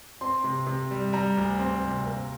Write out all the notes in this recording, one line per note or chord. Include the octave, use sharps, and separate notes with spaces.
C4 C6
C3
C3
G3
G3 A#5
D2
C4
C3
A#3